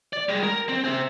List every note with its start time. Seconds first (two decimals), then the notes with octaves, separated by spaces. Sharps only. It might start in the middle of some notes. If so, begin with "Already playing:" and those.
0.13 D5
0.29 G3 G#3
0.43 A#4
0.69 C4
0.85 C5 E5